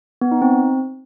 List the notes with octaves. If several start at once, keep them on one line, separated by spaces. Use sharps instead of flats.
B3
D#4
C4